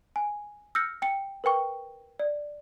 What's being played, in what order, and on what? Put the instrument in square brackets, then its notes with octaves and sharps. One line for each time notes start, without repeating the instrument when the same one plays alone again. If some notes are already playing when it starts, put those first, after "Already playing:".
[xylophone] G#5
E6 F6 G6 A#6 C#7
G5 C#7
A#4 B4 G5 C#6
D5